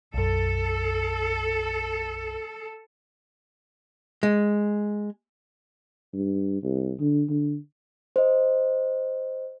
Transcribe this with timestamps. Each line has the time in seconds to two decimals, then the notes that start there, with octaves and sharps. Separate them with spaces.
0.14 B1 F#2 A4
4.23 G#3
6.14 G2
6.63 C2
7.00 D3
7.29 D3
8.16 C5 D#5